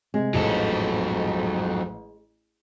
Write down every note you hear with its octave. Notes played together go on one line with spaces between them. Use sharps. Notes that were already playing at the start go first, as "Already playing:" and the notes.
C3 G#3
A1 F2 G#2 F#3 A4 D#5 E7